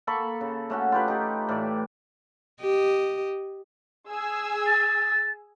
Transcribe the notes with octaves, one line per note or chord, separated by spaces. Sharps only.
A#3 A4 B5 C#6
C#3
A3 C#4 F#4
F4 G4 B4
D#4 G4
A2 E3 D5
G4 D#5
G#4 G#5 E6
A6